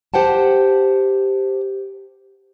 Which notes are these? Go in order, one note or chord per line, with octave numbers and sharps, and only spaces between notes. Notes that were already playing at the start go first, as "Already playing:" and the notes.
G4 C5 F#5 G5 A5